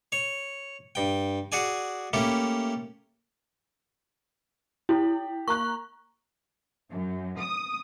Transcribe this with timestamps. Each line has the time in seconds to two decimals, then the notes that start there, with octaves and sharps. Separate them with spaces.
0.12 C#5
0.95 G2 G5
1.52 F#4 G#4 D5 G#5
2.13 A3 A#3 C#4 E4 G4
4.89 E4 G4
5.48 A#3 A#5 C#6 F#6
6.90 F#2
7.39 D#6